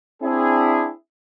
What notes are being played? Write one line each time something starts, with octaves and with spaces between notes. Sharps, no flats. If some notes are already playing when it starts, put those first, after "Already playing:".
C4 D4 E4 G#4